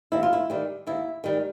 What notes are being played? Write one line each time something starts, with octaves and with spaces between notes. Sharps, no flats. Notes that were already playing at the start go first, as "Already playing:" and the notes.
D#2 E4
F4
E4
D#3 G3
D#2 E4
D#3 G3